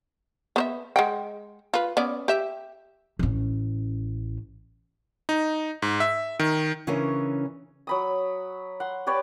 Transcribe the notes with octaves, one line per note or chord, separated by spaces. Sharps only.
B3 C5 E5
G#3 F#5 G5
F4 B4
B3 C#4 D5
G4 E5
A1 C#4
D#4
G#2
E5
D#3
C#3 E3 C#4 D4 A#4 G#5
F#3 B5 D#6
F#5 C6
G4 B4 C#5 D5